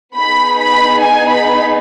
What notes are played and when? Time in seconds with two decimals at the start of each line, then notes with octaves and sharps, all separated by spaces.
0.16 B3 D#4 G#4 B5
0.60 B5
1.03 G#5
1.32 B5